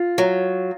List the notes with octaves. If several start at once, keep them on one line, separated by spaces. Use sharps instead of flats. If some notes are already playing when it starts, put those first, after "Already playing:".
Already playing: F4
F#3